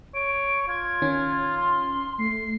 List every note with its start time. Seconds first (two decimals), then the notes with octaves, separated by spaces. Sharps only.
0.14 C#5 D7
0.68 F4 G#6
1.02 D#3 C#4
1.57 C6
2.19 A3 C7